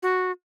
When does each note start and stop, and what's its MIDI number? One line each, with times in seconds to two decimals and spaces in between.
0.03 0.31 66